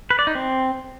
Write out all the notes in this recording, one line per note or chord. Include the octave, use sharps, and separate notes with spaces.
B4
D5
D#4
C4